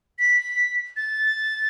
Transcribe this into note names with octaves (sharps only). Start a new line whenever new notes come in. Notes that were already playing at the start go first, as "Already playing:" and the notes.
B6
A6